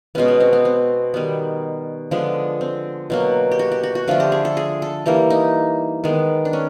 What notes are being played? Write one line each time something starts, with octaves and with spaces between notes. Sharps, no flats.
B2 G#3 B3 C#4
C#4
C4
B3
C4
D#3 G3 B3
D3 F3 G#3 B3
C4
B2 F#3 A#3
G4
F#4
G4
F#4
F#4
D3 F3 A3 F4
G4
G#4
A4
G#4
A4
E3 G3 A#3 G4
D#4
D#3 G#3 B3
D4
C#4